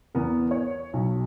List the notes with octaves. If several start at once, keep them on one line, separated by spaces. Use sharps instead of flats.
E2 B3 A#4
C#5
B1